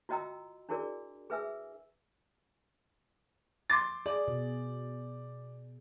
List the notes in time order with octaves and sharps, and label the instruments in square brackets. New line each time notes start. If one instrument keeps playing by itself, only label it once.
[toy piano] F4 F#4 D#5 G5 A#5 E6
D4 E4 F#4 G#4 A#4 D5
G#4 B4 E5 G#5 E6
[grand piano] C6 D6 A6
[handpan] G#4 [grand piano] D5
[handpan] B2